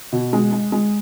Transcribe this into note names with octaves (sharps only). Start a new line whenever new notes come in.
B2
G#3
G#3
G#3